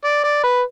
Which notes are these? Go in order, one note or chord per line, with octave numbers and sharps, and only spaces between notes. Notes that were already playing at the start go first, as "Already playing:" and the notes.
D5
D5
B4